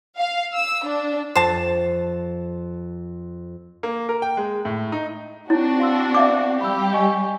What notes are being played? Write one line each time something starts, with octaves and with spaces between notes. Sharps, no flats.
F5
E6
D4
F2 C5 A5
A#3
A#4
G5
G#3
A2
D#4
C4 D4 E4 F#4 C#5
F5 C6 E6
D5 E5 F5 D6
G3 G4 B5 E6
D#5 G#5 C#6